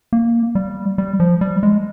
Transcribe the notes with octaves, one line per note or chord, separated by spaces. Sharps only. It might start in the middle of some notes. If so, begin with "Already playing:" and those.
A#3
G3
G3
F3
G3
G#3